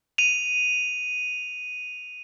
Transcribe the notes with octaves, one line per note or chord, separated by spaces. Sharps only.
D#7 F7